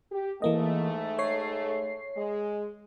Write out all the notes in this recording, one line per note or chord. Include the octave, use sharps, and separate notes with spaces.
G4
G#2 E3 A3 A#3 D#5
C#5 C7
G#3